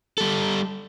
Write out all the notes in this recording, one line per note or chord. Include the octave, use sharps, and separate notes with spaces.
G3 A4